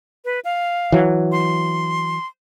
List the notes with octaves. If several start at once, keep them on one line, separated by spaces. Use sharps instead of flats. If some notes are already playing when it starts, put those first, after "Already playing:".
B4
F5
E3 F#3
C6